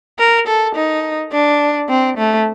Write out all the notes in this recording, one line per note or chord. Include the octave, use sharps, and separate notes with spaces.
A#4
A4
D#4
D4
C4
A3